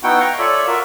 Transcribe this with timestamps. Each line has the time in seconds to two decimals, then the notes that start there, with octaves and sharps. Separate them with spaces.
0.03 B3 D#4 E4 F#4 F#5 G5
0.20 F5 G5 A#5 C#6
0.38 F4 A4 C#5 D5 E5
0.67 F4 F#4 A#4 E5